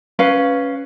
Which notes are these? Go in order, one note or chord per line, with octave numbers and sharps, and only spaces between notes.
C#4 B4 F5